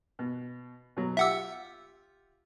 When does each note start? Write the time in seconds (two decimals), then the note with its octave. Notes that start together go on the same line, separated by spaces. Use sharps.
0.19 B2
0.97 B2 F#3
1.17 F4 G4 E5 F#5 D6 E6